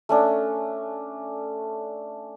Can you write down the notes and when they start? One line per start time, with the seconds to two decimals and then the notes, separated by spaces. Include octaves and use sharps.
0.09 A3 C#4 D4